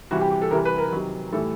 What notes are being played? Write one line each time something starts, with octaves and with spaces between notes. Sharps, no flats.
C3 E3 G3 F#4
G4
G4
A4
C3 E3 G3 A#4
B4
A#4
C3 D#3 F#3
A2 E3 G3 A4